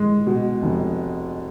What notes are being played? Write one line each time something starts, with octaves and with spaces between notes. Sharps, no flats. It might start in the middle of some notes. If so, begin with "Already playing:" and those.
Already playing: G#3
B2
F1